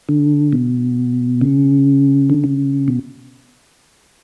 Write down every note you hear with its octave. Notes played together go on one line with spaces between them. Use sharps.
D3
B2
C#3
D3
C#3
B2